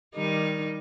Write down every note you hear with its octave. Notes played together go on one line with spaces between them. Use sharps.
D#3 G3 D#4